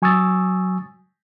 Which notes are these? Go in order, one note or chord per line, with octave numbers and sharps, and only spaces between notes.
F#3 G#5 C#6 D#6 E6 A6